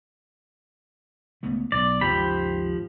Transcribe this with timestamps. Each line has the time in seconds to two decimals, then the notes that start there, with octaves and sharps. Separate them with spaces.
1.43 C#2 A3 B3
1.72 B1 D5
2.01 G#1 D#2 C#3 F3 G4 B5